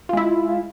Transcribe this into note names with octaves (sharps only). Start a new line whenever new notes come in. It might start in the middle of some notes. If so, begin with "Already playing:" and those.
G#3 E4 F4